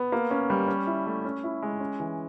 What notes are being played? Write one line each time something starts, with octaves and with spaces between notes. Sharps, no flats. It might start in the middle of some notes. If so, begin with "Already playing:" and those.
Already playing: B3
A#3
C#4
G3
C#4
E4
A3
C#4
E4
G#3
C#4
E3